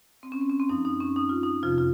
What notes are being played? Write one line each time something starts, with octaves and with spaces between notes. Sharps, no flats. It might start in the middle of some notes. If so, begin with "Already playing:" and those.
C4
C#4
C4
C#4
C4
F#2 F3 D#4
D#4
C#4
D#4
F4
D#4
F2 C3 F3 F4
F4